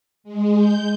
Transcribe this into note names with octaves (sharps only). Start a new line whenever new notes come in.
G#3
G6